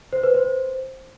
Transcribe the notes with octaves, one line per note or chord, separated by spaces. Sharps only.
C5
B4
C5